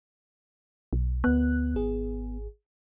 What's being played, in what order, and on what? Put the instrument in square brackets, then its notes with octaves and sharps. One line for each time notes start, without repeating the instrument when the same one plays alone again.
[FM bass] B1
[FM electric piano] D2 F#6 [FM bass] B3
[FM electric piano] G#1 G#4